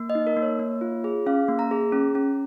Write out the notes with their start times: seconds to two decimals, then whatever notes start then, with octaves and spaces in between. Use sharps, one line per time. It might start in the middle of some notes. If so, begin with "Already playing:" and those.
Already playing: A#3
0.10 D#5
0.15 D#4
0.27 A#4
0.37 A#3
0.42 C#5
0.59 A#3
0.81 F4
1.04 G#4
1.26 C#4 F5
1.48 A#3
1.59 A#5
1.71 G#4
1.92 C#4
2.15 C#4